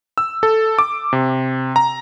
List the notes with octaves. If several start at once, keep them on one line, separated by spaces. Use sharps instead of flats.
E6
A4
D6
C3
A#5